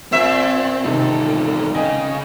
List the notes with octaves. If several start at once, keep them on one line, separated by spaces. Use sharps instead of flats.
A#2 C4 E5
E2 G#2 C3 D#3 A4
C#3 D#5 G5 G#5